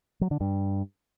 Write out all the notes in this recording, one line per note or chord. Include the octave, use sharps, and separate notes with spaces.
F#3
D3
G2